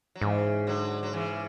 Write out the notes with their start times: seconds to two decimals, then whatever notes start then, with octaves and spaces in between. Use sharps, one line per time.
0.15 F#3
0.21 G#2 C#3 E3
0.67 D3 F#3
1.03 F#3
1.13 C#3 E3